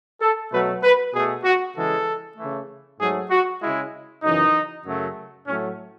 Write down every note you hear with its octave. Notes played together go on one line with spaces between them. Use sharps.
A4
B2 F#3 A3 B4
B4
B2 A3 G#4
F#4
C#3 E3 G#3 A4
C#3 E3 A3
G#2 F#3 A3 G#4
F#4
C#3 G#3 E4
F#2 C#3 E3 D#4
F#2 C#3 F#3 A3
A2 F#3 A3 C#4